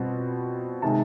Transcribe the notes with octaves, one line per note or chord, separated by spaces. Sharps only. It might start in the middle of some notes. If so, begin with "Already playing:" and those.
Already playing: B2 G3 C4 F4
C3 D#3 G#3 A5